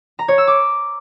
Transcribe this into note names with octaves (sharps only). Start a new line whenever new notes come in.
A#5
C#5
E6
D6